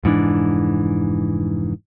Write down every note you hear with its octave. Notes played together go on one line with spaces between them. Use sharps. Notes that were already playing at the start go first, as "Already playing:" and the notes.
F1 G#2 E3 D4